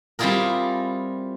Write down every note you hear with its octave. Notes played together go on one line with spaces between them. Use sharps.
G3 C4 E4 F4 G#4 A#4